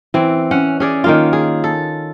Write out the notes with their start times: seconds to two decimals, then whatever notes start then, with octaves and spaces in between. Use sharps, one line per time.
0.14 E3 C4
0.51 C#4 F#5
0.80 C#4 G#4 D5
1.04 D#3 A#3 F4
1.33 G#4
1.64 A4